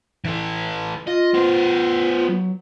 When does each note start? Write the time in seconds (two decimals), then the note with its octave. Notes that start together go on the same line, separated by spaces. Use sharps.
0.25 E3 A4
1.07 F4 D#5
1.34 B3 C5
2.29 F#3